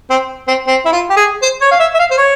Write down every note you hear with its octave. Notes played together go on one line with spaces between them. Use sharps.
C4
C4
C4
E4
F4
G4
G#4
C5
C#5
F5
E5
E5
F5
C5
C#5